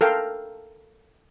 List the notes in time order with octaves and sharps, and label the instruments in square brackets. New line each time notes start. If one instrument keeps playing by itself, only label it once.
[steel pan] A4 A#4 F5 G5